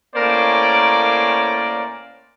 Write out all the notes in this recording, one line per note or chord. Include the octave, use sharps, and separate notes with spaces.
A2 A#3 C#4 A#4 C5 D5